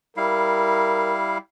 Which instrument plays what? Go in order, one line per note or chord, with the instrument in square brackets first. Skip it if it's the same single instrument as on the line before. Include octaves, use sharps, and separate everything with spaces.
[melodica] G3 E4 F5 [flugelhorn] A#4